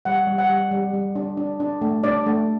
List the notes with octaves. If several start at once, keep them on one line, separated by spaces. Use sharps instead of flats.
G3 F#5
G3
F#5
G3
G3
G3
D4
D4
D4
A3
D4 D5
A3